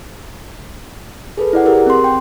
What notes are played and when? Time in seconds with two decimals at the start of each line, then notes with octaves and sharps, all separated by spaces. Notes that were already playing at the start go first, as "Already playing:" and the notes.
1.37 G#4 A4 B4
1.53 E4 D5 F#5
1.66 G4 G#4 A#4
1.87 C4 C6
2.04 G5